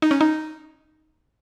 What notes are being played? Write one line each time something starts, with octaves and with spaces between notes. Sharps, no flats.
D#4
C#4
D#4